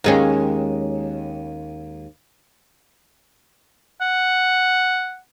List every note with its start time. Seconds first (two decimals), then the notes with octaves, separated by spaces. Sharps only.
0.04 D#2 G#3 C#4
4.01 F#5